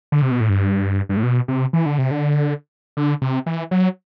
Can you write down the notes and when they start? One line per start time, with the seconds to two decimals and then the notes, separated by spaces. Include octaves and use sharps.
0.12 D3
0.22 C3
0.31 B2
0.40 A2
0.49 G2
1.09 G2
1.17 A2
1.23 B2
1.48 C3
1.73 E3
1.86 D3
1.98 C3
2.11 D3
2.97 D3
3.22 C3
3.46 E3
3.71 F#3